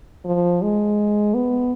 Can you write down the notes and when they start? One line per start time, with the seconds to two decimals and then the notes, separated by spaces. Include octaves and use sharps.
0.25 F3
0.62 G#3
1.34 B3